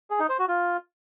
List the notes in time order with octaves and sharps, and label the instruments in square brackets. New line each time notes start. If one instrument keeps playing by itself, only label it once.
[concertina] G#4
D#4
C5
F#4
F4